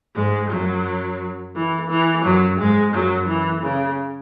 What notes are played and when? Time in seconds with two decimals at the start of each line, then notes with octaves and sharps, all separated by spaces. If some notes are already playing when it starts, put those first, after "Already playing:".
0.15 G#2 G#3
0.50 F#2 F#3
1.54 E3
1.89 E3
2.23 F#2 F#3
2.58 G#2 G#3
2.93 F#2 F#3
3.28 E3
3.63 C#3